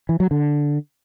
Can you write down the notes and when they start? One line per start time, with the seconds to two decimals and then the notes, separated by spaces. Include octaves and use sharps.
0.09 E3
0.20 F#3
0.31 D3